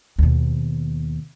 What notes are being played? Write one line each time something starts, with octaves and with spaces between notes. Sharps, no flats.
D#2 B2